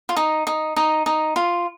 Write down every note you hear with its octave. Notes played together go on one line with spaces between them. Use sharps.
F4
D#4
D#4
D#4
D#4
F4